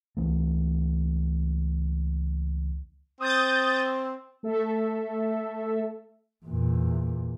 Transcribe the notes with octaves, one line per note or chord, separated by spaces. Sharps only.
C#2 E3 A3
C4 D#6 G6 A6
A3 A4 E5
E2 A#2